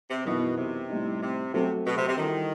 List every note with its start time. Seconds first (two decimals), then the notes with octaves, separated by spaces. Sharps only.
0.09 C3
0.25 F#2 B2 E3 B3 D#4
0.57 C3
0.89 A2 G3 D#4
1.22 C3
1.53 C3 F#3 A3 C4 F#4 A4
1.86 B2
1.97 C3
2.08 C3
2.18 D#3 E3 G3 D#4 F#4 A4